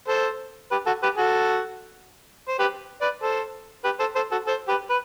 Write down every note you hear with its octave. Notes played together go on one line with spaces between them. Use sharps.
A4 C5
G4 B4
F#4 A4
G4 B4
F#4 A4
C5
G4 B4
B4 D5
A4 C5
G4 B4
A4 C5
A4 C5
F#4 A4
A4 C5
G4 B4
B4